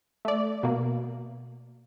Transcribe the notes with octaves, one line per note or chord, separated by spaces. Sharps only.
A3 D5
B2 A#3